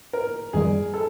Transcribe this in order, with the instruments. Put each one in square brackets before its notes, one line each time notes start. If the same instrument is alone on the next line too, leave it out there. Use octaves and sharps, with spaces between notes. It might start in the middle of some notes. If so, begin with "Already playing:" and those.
[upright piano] A#4
[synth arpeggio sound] F#2 D#3 G3 [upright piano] G#4
[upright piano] A4